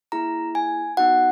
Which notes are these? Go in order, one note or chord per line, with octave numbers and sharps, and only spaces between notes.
A#3 E4 G#4 A#5
G#5
B3 D#4 F#4 F#5